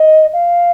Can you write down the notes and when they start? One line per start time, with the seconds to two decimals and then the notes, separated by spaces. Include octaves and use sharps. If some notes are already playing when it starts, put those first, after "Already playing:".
Already playing: D#5
0.33 F5